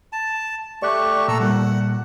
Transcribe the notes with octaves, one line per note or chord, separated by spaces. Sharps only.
A5
A3 G4 D5 C#6 F#6
A#2 A4 A#5 E6
A#2 G3 F#5